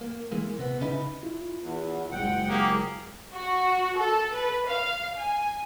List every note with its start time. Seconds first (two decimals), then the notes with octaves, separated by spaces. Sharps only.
0.01 A#3
0.32 E3 G#3 A#3
0.59 C3 B3
0.81 C#3 D#4 E4 B4
1.23 E4 F4
1.60 E2
2.11 F#1 G#3 F#5 G5
2.49 A#3 G4 G#4
3.34 F#4
3.97 A4
4.34 B4
4.67 F5
5.19 G#5